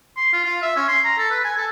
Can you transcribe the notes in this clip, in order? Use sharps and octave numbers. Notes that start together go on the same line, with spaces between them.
C6
F4
F4
E5
C#4
C6
A#5
A4
B4
G#5
A4